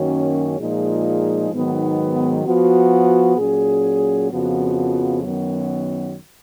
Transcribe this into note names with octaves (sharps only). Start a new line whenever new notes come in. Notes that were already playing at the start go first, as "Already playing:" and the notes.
Already playing: F#2 D#3 A#3 C#4 F#4
A#2 F3 G#3 D#4 G#4
G#2 D#3 F#3 B3 D#4
F3 B3 F#4
A#2 F#3 C#4 G#4
F2 C#3 F3 B3 F#4
F#2 D#3 F#3 B3